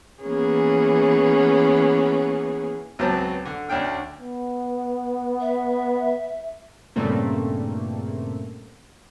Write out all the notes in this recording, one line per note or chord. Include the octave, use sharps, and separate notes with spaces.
E3 A#3 B3 C#4 G#4
C#2 F#3 B3 C4 A5
D3
D2 C#4 D4 G5 F6
B3
E5
G2 A#2 C#3 A3 A#3 C4